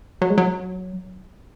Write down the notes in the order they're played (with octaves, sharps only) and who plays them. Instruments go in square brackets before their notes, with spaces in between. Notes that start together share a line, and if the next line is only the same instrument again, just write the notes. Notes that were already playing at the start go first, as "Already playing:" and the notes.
[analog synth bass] F#3
G#3
F#3